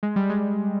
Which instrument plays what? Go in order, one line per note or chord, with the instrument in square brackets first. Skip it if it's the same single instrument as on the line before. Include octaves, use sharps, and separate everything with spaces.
[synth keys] G#3
G3
G#3